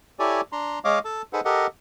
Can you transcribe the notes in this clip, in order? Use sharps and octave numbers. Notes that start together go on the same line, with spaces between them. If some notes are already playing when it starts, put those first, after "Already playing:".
E4 G4 A4 C#5 D5 G#5
D4 A#5 C6
G#3 C#5 D#5 F5 D6
A4 A5
D#4 G#4 A4 B4 C5 F#5
G4 A4 A#4 D#5 F#5